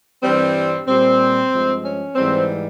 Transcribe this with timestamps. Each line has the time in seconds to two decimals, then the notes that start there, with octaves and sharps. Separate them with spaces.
0.22 G2 E3 G3 C4
0.86 A#2 G3 C4
1.51 G2 F3 G#3
1.84 C#4
2.16 G#2 E3 G3 C4